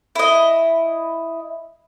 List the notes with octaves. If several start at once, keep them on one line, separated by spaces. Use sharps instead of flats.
E4 D#5